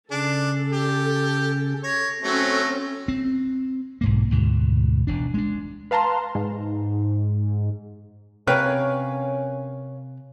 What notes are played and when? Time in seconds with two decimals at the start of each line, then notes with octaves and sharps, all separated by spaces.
0.11 C#3 C#4 D4 A4
0.72 G4
1.84 C#5 A#6
2.23 F#3 A3 C4 C#4 A4
3.08 C4
4.01 B1 G#2 A#3
4.31 D2 G#2 B2
5.07 E1 D4
5.34 G#3 D4
5.91 B4 F5 A5 A#5 C6
6.35 G#2
8.47 C3 C#4 A#4 B4 C#5 F5 G5